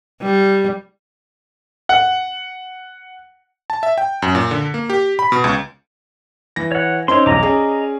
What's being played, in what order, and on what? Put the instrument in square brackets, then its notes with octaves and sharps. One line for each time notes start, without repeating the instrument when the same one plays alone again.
[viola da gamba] G3
[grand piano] F#5
[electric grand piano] A5
E5
G5
F#2
A#2
D3
A#3
G4
B5
B2
C#2
[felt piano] E3 A#6
[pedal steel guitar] C#5 F#5
[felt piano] C4 C#4 D#4 [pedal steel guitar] C#5 C6
[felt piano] B1 E2 [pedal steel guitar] D#5 A#5 D6
[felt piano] C#4 G#4 D5